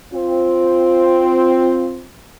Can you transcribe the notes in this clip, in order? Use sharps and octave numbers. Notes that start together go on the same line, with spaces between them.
C4 F4